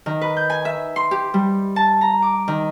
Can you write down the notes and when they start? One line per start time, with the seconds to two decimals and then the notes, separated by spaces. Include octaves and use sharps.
0.06 D#3
0.21 B4
0.37 G6
0.50 G#5
0.65 E5
0.96 C6
1.11 G4
1.34 G3
1.76 A5
2.01 A#5
2.22 D6
2.48 D#3